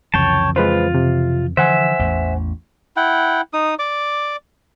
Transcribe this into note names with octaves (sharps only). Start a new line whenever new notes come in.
C2 F2 C#3 E3 C#5 G5 A5
G#3 F4 B4 C5
C3
D3 E3 F3 C5 E5 F#5 G#5
A1 E2
E4 F#5 G5
D#4 D#6
D5 D6